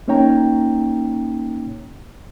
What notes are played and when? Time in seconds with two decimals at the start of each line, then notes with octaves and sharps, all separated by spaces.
0.08 A#3 C#4 D#4 C#5 G5 A#5